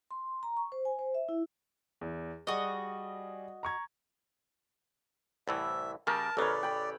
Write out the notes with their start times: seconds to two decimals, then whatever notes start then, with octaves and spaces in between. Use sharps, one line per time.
0.11 C6
0.43 A#5
0.57 C#6
0.72 C5
0.85 G#5
0.99 C5
1.15 E5
1.29 E4
2.01 E2
2.47 G3 F#4 G#4 D#5
3.63 A#5 C#6 G#6
5.48 C2 A2 E3 E5
6.07 C#3 G3 A#4 A5
6.37 A1 C#3 A4 B4 C#5 D5
6.63 G5 B5